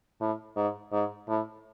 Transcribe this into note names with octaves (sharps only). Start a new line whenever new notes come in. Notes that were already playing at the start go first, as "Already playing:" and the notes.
A2
G#2
G#2
A2